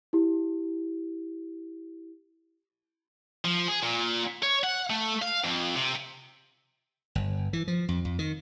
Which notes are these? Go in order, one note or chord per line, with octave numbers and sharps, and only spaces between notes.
E4 G4
F3
G#4
A#2
C#5
F#5
A3
F5
F2
C3
G1
E3
F3
F2
F2
D#3